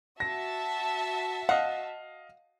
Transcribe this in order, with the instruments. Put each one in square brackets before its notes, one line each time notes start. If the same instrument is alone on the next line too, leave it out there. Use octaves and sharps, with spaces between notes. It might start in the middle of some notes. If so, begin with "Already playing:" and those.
[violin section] F#4 E5 A5 [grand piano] A#6
[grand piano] D#5 F5 [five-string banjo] F#5